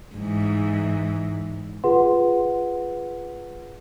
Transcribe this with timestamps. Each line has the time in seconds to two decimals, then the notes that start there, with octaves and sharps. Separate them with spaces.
0.16 G#2 E3
1.84 F4 G#4 B4 F#5 C6